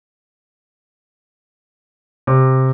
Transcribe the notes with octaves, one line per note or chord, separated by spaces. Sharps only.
C3